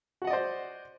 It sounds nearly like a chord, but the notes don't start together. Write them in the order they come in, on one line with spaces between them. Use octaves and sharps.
F#4 F#5 D#5 D5 C5